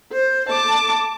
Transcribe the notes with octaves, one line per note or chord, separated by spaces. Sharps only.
C5
A5 D6